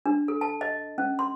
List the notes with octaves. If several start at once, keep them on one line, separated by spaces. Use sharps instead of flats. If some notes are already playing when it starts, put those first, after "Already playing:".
D4
A4
A5
D#5
C#4
C6